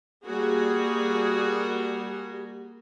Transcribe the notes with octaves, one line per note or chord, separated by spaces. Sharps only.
G3 A#3 F#4 G#4